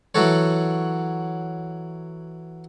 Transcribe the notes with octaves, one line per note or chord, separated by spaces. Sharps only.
E3 F#3 F#4 A4 C#5